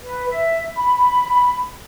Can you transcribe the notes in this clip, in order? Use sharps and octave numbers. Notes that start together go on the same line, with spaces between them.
B4
E5
B5